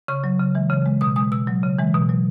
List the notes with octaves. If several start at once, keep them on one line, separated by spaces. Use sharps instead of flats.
C#3 C#6
F#3
C#3
E3 G#3
C#3
G#3
B2 D#6
G#3 D#6
B2 E6
F#3
C#3
E3 G#3
B2
F#3